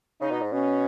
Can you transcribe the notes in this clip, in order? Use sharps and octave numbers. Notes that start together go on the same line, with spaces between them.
C#3 D#4
B2
G#2
B2 C#4